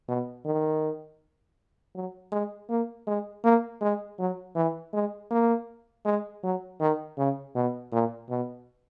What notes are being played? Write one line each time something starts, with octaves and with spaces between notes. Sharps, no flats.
B2
D#3
F#3
G#3
A#3
G#3
A#3
G#3
F#3
E3
G#3
A#3
G#3
F#3
D#3
C#3
B2
A#2
B2